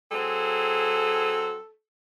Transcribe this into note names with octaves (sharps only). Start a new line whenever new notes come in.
F#3 C4 G#4 A4